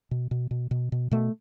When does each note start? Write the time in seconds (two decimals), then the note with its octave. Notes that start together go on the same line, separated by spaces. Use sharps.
0.11 B2
0.31 B2
0.51 B2
0.71 B2
0.92 B2
1.11 B2 A3